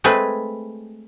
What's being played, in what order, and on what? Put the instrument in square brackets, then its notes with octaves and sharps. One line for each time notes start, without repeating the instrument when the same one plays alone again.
[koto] G#3 A3 C4 G#4 B4